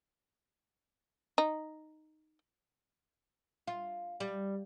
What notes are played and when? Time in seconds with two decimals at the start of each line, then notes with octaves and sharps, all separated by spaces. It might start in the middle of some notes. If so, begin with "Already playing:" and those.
1.38 D#4
3.68 F4
4.20 G3